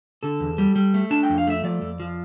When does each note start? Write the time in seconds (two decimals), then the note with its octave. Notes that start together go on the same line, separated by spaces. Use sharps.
0.23 D3 A4
0.40 E2
0.58 G3
0.76 G3
0.94 A3
1.11 D4 A5
1.23 G5
1.30 F2
1.38 F5
1.47 A3 E5
1.64 F3 D5
1.82 F2
2.00 F3